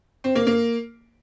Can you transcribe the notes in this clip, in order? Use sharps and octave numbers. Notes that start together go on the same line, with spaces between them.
C4
A#3
A#3